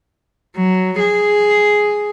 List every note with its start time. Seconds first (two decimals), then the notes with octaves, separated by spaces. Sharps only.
0.56 F#3
0.99 G#4